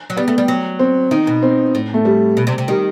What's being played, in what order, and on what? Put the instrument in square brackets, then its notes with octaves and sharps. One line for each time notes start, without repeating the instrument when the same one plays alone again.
[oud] F#3
[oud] G3 [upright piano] B3
[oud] A3
G3
F#3
[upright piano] C4
[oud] D#3 [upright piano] D#4
[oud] B2
[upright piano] C4
[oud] A2
[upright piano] A3
G3
[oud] B2
C3
C3
[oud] D#3 [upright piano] G3